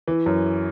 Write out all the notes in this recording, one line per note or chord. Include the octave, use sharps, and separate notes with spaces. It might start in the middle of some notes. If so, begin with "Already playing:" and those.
E3
F#2